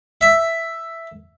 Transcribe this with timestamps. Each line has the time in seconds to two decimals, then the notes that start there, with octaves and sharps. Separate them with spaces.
0.21 E5